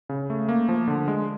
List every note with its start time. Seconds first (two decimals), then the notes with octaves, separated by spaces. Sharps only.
0.09 C#3
0.30 A3
0.49 A#3
0.69 F3
0.88 D3
1.08 G#3